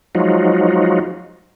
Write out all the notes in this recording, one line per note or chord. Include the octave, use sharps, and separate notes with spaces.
F3 F#3 G#3 D#4 F4 F#4